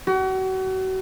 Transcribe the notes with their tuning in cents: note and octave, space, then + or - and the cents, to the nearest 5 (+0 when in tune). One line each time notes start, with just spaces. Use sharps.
F#4 +35